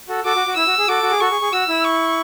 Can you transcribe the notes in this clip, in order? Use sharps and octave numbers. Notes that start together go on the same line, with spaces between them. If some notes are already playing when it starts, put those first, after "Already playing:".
F#4 A4
F#4 A4 D6
F#4
F#4
E4 E6
F#4
G#4
F#4 A4 D6
F#4
G#4
F#4 A4 C#6
G#4
G#4
F#4 E6
E4
C#6